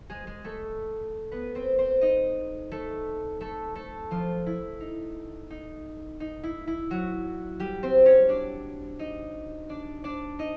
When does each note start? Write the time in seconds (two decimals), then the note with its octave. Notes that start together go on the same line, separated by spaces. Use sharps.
0.10 G#3 G#4
0.27 G#3 G#4
0.44 A3 A4
1.32 B3 B4
1.55 C4 C5
1.78 C4 C5
2.01 D#4 D#5
2.71 A3 A4
3.41 A3 A4
3.75 A3 A4
4.11 F3 F4
4.46 E4
4.80 D#4
5.50 D#4
6.20 D#4
6.43 E4
6.67 E4
6.90 F#3 F#4
7.59 G3 G4
7.83 C4 C5
8.05 C#4 C#5
8.29 D4 D5
8.99 D#4 D#5
9.69 D4 D5
10.04 D4 D5
10.39 D#4 D#5